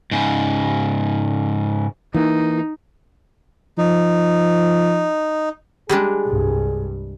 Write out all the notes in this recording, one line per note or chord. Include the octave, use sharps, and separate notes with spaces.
G#2 C#3
E3 A#3 D#4
F3 D#4
G3 G#3 D4 G#4
C2 G2